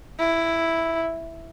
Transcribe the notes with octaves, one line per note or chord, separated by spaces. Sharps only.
E4